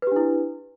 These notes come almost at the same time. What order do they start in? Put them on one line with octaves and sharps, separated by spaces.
B4 G4 D4 E4